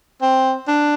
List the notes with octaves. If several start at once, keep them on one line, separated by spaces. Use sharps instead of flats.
C4
D4